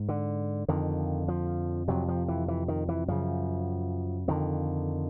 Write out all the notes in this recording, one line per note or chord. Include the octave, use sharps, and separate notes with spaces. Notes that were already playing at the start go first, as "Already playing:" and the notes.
Already playing: G#2
D3
F2 D3 D#3
F3
F2 C3 F#3
F3
E3
E3
D#3
E3
F#2 C#3 F3
F2 D3 D#3